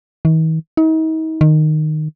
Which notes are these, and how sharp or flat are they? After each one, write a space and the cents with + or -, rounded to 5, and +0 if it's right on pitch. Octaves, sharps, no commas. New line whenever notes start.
D#3 +45
D#4 +40
D#3 -15